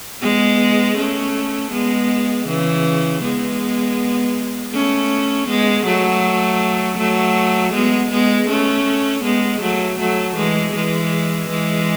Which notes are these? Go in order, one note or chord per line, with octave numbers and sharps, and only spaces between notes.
G#3 B3
A3 C#4
G#3 B3
C#3 E3
G#3 B3
A3 C#4
G#3 B3
F#3 A3
F#3 A3
G#3 B3
G#3 B3
A3 C#4
G#3 B3
F#3 A3
F#3 A3
E3 G#3
E3 G#3
E3 G#3